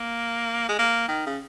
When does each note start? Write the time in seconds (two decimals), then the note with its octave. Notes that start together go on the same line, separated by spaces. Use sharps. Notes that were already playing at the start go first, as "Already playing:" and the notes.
Already playing: A#3
0.69 G#3
0.79 A#3
1.08 D#3
1.26 C#3